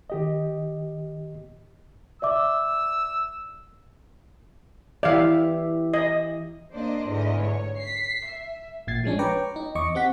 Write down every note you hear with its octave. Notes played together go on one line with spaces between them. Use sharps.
D#3 G4 D#5
D5 E5 D6 E6
E3 G4 D5 E5 F5
D#5
A#3 D4 C5 D5 D#5
E2 G#2 D3 A3 D#5
C#5
B6 C7
E5
A1 A#2 G#6 A6 C7
F3 G#3 C#4 D4
B4 C#5 G5 A#5 C#6 D6
D#4
E2 D#5 C#6 D6
C4 G4 F#5 B6